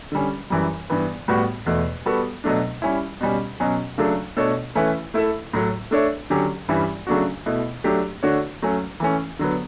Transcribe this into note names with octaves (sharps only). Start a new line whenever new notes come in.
D3 G3 C#4
F#2 E3 G3
G2 E3 B3
A2 G3 B3 F#4
E2 B2 A3
G3 B3 F#4 A4
B2 F#3 A3 D4
G3 C#4 E4
B2 G3 C#4
B2 F#3 C#4
C#3 F#3 A3 D4 A4
B2 A3 D4 A4 C#5
E3 A3 C#4 E4 B4
A3 E4 A4 E5
A2 F#3 A3
A3 D4 A4 C#5 E5
D3 F#3 C#4 G4
G2 E3 G3 C#4 E4
C#3 F#3 A3 D4 F#4
B2 A3 E4
F#3 A3 D4 G4
D3 A3 D4 F#4 C#5
F#3 A3 C#4
E3 A3 C#4
D3 F#3 B3